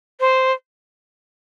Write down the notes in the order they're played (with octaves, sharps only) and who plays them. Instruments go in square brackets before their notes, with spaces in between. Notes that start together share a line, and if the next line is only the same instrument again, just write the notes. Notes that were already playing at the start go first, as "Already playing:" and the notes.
[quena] C5